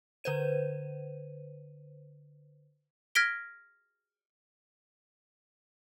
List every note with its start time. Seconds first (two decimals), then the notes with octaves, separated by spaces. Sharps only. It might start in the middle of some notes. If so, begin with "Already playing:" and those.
0.24 D3 B4 C5 D#7
3.15 F6 G#6 A#6 B6 D7 G7